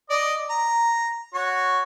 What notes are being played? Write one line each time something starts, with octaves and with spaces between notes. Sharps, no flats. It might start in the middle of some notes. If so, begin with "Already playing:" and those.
D5 D#5
A#5
F#4 C#5